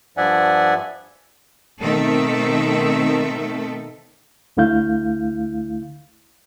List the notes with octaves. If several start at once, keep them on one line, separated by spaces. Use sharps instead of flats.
G2 F3 D5 E5 F#5 G#5
B2 D#3 A3 C4 A4 E5
D2 D3 A3 E4 F5 G6